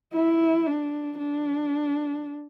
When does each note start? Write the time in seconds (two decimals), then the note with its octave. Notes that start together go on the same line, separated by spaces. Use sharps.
0.13 E4
0.67 D4
1.18 D4